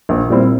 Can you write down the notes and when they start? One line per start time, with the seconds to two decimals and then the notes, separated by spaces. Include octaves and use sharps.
0.09 A#1
0.29 A#2 G3 C4 E4